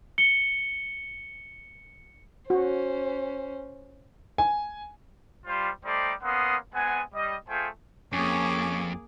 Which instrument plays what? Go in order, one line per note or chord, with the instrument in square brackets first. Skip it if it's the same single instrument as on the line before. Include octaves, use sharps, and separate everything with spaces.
[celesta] C#7 G7
[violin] C#4 C5 [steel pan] F#4
[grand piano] G#5
[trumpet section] G3 F4 C5
G3 A3 D#4 G4 C5 D5
A#3 B3 C#4 F#5 C6 D#6
G#3 B3 C4 F#5 G#5
G3 D#5
A3 F4 G#4 C5 G5 G#5
[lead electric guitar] F2 [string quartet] A#3 G#4 D6 [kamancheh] C#4